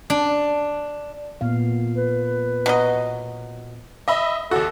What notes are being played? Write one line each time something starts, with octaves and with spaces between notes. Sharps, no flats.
D4
A#2 B3 F5
B4
B2 F#3 D#5
D#5 E5 B5
D#2 F#4 A4